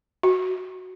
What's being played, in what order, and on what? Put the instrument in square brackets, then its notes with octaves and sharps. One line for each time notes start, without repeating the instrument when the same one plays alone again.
[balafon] F#4